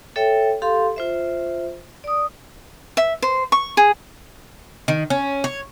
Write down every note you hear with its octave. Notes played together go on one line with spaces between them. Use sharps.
A4 C#5 E5 G5
G4 A4 F5 C6
F4 C5 E5
D5 D#6
E5
C5
C#6
G#4
D#3
C#4
C#5